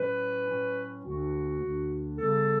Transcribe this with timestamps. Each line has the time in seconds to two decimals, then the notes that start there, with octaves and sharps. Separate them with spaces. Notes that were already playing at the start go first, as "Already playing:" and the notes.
Already playing: A2 F#3 C#4 B4
0.48 A2 F#3 C#4
1.05 D2 D3 A3 D4 F#4
1.61 D2 D3 A3 D4
2.19 C#3 G3 B3 A4